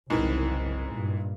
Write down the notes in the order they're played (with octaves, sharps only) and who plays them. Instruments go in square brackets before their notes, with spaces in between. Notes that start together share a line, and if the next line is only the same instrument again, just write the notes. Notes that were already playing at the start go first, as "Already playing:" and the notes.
[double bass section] F#1 C2 [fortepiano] G#2 D#3 E3
[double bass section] G2 A#2